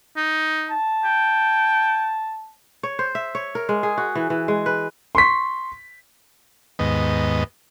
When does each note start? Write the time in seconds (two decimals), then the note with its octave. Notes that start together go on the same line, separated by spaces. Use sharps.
0.16 D#4
0.70 A5
1.04 G5
2.83 C#5
2.99 C5
3.15 E5
3.35 C#5
3.55 A#4
3.69 G#3
3.83 G#4
3.98 F#4
4.15 E3
4.30 E3
4.48 G#3
4.66 B4
5.15 C6 C#6 B6
6.79 D#2 G#2 B3 D#5